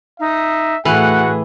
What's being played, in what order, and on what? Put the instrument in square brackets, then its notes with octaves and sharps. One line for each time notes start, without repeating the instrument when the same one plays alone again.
[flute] D#4 [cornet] E5
[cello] A2 G#4 [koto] E3 [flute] F#4 [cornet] F#5